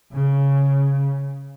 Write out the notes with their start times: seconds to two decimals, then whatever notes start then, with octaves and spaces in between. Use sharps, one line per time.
0.12 C#3